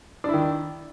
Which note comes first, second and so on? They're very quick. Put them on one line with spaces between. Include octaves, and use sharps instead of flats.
D4 E4 D#3